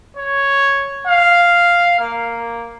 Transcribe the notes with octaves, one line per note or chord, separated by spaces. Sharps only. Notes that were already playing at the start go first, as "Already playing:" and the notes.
C#5
F5
A#3